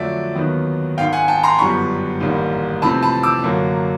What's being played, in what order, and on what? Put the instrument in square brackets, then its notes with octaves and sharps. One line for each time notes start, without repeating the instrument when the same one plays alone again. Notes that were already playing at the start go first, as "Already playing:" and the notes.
Already playing: [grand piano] F2 D3 F#3 A3 D5 E5
D#2 D#3 F#3 B3
G#1 G#2 D#3 F5 G5
F#5 G#5
G5 A5
A#5 C6
G1 F#2 D3 G3 B3 B5 C#6
A1 G#2 D#3 G3 A#3
F2 C3 E3 A3 C4 A5 B5
A5 B5
D6 E6
F#2 D3 F#3 A#3